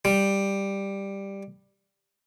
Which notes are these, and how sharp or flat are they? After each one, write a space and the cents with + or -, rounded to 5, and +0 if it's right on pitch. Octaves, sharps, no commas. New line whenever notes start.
G3 +5